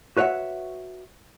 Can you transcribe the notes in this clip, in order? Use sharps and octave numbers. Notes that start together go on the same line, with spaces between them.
F#4 B4 C#5 E5 F#5